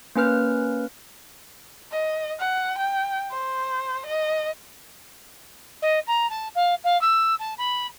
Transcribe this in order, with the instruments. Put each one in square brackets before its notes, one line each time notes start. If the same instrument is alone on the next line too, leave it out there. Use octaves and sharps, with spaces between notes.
[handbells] A#3 C#4 B4 F6
[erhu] D#5
F#5
G5
C5
D#5
[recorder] D#5
A#5
A5
F5
F5
E6
A5
B5